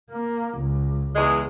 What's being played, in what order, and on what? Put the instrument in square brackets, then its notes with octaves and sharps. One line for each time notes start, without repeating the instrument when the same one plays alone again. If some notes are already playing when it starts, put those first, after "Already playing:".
[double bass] A#3
C#2
[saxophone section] E2 G#3